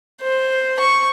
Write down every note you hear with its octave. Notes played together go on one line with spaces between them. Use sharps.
C5
C#6